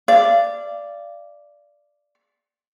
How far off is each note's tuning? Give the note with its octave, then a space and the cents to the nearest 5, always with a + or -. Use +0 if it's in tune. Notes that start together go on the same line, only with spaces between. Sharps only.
D5 +0 F5 -35